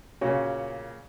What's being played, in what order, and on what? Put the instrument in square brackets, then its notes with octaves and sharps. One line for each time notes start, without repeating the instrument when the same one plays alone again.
[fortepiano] A#2 C#3 C#4 F#4